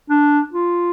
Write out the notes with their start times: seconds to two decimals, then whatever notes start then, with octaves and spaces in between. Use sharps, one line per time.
0.10 D4
0.53 F4